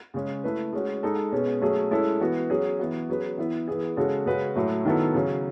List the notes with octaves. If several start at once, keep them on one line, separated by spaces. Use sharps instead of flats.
C#3 G#3 C#4
A3 E4 B4
G#3 C#4 F#4
G#3 D#4 A4
B2 G#3 C#4 G#4
F#3 A3 C#4 G#4
G#3 C#4 E4 A4
E3 B3 F#4
F#3 C#4 G#4
E3 B3 F#4
F#3 C#4 G#4 B4
E3 B3 E4 B4
E3 B3 E4 G#4
C#3 G#3 C#4 F#4 A4
C#3 G#3 C#4 F#4 B4
A2 F#3 A3
D#3 F#3 B3 E4 A4
C#3 F#3 C#4